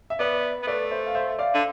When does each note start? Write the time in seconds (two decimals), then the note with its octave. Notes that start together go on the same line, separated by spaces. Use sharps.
0.10 E5
0.19 B3 B4 D5
0.63 B3
0.67 A3 B4 D5
0.91 C5 E5
1.06 F5
1.15 C5 E5
1.39 D5 F5
1.54 D3